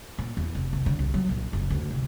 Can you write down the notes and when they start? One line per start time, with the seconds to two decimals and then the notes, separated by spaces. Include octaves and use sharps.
0.18 A#2
0.37 E2
0.55 F1
0.73 C2
0.86 D3
0.99 C2
1.14 F#3
1.29 A#1
1.53 F#1
1.70 D2
1.90 C2